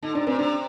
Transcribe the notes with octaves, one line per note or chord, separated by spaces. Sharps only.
D3 D#4
C3 D4
A#2 C4
C3 D4